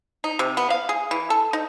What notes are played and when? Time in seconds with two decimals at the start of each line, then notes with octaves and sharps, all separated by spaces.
0.24 D#4
0.39 C3
0.57 B3
0.70 F5
0.89 G#4
1.11 E3
1.30 A4
1.53 D#4